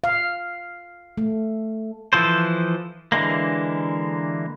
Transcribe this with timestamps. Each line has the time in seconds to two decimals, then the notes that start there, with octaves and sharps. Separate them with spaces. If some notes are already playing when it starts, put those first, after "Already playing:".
0.04 F5
1.17 A3
2.13 E3 F3 A4 C5
3.12 D3 E3 G#3 A#3